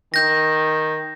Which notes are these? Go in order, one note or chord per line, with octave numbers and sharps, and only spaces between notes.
D#3 G6 A#6